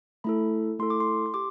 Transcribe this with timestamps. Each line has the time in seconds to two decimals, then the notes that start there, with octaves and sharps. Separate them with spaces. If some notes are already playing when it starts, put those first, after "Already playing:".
0.24 A3 E4 A4 B5
0.79 A3 E4 A4 C6
0.90 D6
1.00 C6
1.26 C6
1.34 G4 D6